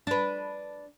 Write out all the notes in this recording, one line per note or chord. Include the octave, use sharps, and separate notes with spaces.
D4 B4